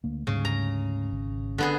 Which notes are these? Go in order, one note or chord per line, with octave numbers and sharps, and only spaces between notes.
D2 A#3
D2 G#2 C#3 G3
A#5
G#1
D3 B3 G#4